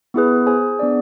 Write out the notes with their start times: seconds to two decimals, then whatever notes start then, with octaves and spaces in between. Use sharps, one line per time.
0.14 B3 E4 G#4 B4
0.47 G#4 C5 G#5
0.79 B3 D4 G#4 D5